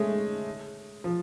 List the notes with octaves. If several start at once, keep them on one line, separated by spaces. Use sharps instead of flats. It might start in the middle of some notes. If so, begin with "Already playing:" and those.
Already playing: G#3 A3 C#4
F3